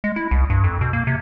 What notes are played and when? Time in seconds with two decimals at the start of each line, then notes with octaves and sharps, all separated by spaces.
0.04 G#3
0.16 E4
0.31 C2
0.50 G2
0.64 F2
0.81 B2
0.93 A#3
1.07 C3